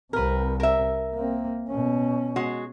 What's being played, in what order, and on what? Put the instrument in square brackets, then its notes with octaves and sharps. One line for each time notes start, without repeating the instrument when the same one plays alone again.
[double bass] C2 C3 [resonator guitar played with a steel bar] A#4 B4
[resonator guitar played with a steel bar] A#4 E5
[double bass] A#3 C4
B2 C#4
[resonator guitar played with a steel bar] G#3 F#4